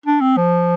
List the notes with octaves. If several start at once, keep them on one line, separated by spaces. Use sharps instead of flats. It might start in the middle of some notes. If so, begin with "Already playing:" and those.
D4
C4
F3